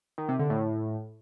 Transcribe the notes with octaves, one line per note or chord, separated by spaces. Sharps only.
D#3
C3
D3
A2